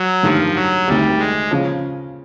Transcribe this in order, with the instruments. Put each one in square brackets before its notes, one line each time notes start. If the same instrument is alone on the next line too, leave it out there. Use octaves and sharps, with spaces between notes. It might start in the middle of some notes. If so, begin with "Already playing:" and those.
Already playing: [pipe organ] F#3
[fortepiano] G2 D#3 G3 [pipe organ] F3
[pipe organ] F#3
[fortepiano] D2 C3 D#3 [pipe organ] G3
[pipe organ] G#3
[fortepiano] C#3 F3